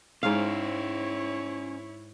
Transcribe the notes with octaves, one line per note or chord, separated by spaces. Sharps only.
G#2 C#4 E4 C5 C#5 F5